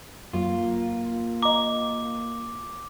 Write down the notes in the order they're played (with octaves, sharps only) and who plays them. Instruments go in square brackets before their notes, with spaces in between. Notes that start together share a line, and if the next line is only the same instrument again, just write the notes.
[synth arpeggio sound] F#2 F#3 [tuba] A#3 [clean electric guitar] F4
[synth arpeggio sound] D#5 A#5 [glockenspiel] D6